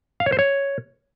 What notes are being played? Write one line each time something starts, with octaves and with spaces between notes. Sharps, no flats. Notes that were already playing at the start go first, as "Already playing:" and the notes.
F5
C#5
C5
C#5